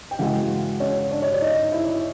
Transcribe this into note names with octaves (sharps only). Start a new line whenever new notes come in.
G5
C#3 E3 G#3 F#4 F#5
C#4 C#5
D4 D5
C#5
D5
D#4 D#5
E4 E5